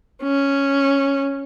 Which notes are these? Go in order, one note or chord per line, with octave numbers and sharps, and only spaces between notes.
C#4